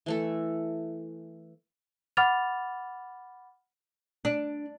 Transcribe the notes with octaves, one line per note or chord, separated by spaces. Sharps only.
E3 A3 A4
F#5 B5 D6 F6 A6 F7
D4